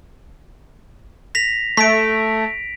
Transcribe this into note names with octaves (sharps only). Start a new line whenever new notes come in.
A#6 B6 F7
A3 B6 D7